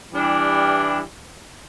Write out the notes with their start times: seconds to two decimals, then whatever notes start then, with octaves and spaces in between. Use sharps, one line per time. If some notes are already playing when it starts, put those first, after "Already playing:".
0.12 E3 G3 D4